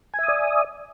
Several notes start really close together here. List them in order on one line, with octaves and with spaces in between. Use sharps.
G#5 E5 D#6 D5